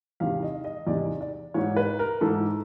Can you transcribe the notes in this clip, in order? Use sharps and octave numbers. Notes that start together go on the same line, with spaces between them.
E2 C3 D#3 F5
D#5
D#5
E2 C3 D#3 D5
D5
G#2 E3 C#5
B4
A#4
G#2 E3 A4